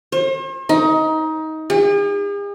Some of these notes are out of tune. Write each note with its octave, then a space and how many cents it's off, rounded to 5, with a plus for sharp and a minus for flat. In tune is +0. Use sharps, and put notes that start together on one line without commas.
C5 +45
D#4 +20
G#4 -45